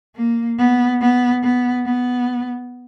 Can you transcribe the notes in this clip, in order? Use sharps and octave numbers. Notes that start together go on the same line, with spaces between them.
A#3
B3
B3
B3
B3